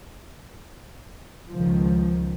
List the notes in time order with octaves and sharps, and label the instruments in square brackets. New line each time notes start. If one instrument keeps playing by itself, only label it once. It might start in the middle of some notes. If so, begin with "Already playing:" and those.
[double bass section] C#2 D#3 F3